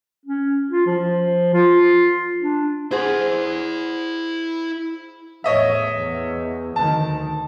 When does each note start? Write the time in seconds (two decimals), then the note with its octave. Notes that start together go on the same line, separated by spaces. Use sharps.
0.26 C#4
0.71 F4
0.86 F3
1.54 F4
2.41 D4
2.91 E4 G#4 C5 F#5
5.44 E2 A2 C#5 D#5 E5
5.94 E2
6.76 D2 D#3 A5